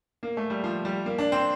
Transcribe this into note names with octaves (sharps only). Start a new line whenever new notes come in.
A#3
A3
G3
F3
G3
A#3
D4
C4